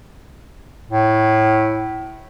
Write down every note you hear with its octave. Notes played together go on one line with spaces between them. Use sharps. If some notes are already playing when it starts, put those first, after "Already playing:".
A2